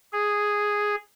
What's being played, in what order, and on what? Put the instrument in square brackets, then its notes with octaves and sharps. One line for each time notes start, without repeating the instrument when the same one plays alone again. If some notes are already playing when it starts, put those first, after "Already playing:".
[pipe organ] G#4